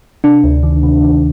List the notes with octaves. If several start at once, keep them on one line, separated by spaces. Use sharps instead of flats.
C3 D4
D2
D#3
C3
D#3